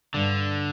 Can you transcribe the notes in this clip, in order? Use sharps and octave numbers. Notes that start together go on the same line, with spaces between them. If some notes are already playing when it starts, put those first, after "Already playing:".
G2 D3